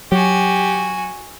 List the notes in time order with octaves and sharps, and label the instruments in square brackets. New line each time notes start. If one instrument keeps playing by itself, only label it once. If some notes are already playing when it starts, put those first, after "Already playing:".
[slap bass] F#3 [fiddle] F#4 G#5 [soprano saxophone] G4